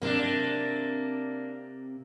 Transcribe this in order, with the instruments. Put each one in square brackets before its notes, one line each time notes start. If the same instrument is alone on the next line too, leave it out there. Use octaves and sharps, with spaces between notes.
[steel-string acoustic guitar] C3 C4 [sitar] A#3 D4